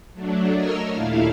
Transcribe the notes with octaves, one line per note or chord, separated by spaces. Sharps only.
F#3 A3 D4
A#4 C#5 D#5 E6 F6
D#2 A#2 A3 E4 F5